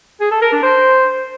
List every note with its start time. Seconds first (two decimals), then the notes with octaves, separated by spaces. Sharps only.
0.21 G#4
0.31 A4
0.42 A#4
0.52 D4
0.63 C5